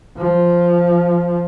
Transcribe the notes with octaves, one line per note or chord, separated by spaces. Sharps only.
F3